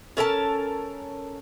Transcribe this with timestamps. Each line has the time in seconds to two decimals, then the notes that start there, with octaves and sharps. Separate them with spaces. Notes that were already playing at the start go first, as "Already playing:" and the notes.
0.17 C#4 A4 A#4 A5